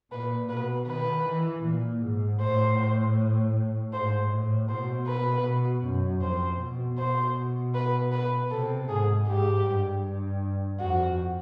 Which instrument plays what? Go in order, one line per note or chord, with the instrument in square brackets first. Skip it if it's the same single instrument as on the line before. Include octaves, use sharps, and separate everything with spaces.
[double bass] A#2 [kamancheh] B4
[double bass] B2 [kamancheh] B4
[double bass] D#3 [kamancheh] B4
[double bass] E3
A#2
G#2
[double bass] A2 [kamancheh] C5
[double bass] G#2 [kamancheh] C5
[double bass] A2
[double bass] B2 [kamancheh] C5
[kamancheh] B4
[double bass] B2
F#2
[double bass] F2 [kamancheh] C5
[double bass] B2
[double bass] B2 [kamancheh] C5
[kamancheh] B4
B4
[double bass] C3 [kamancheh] A4
[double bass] G#2 [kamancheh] G#4
[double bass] G#2 [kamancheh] G4
[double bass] G2
[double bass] F2 [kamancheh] F#4